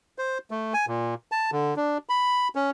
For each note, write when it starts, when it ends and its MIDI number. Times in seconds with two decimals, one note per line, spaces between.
0.18 0.38 72
0.51 0.74 57
0.74 0.86 80
0.88 1.14 46
1.32 1.50 81
1.52 1.74 50
1.76 1.98 62
2.09 2.48 83
2.55 2.71 61